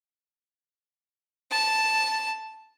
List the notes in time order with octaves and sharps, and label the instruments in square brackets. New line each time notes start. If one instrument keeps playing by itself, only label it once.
[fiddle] A5